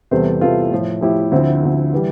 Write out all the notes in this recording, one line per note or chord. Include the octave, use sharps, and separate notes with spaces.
E2 C3 E3 G3 A4 C5
E2 C3 E3 G3 F4 A4
A2 F3
A2 F3 E4 G4
D2 D3 F3 C4 E4
D2 D3 F3
E3 G3